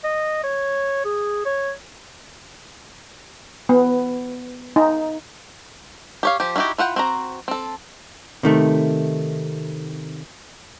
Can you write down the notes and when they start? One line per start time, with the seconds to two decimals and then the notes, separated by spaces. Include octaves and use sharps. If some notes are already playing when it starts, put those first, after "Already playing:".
0.04 D#5
0.43 C#5
1.05 G#4
1.45 C#5
3.69 B3
4.76 D#4
6.23 G4 C#5 F5
6.40 F3 G4
6.56 C#4 D#4 E4 F#4 G4
6.78 E4 F4 F#5 G5
6.96 C4 F#4 A#5
7.48 C4 A4
8.43 C3 D#3 A3